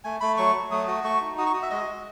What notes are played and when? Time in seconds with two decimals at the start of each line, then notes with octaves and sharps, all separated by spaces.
0.04 A3 G#5
0.21 A3 B5
0.37 F#3 C#6
0.55 F#3
0.71 A3 D#6
0.88 F#4 D#6
1.04 A3 C#6
1.21 D#4
1.38 F#4 D#6
1.46 C#6
1.54 F#4 D#6
1.63 E5
1.71 G#3 D#5
1.87 F#4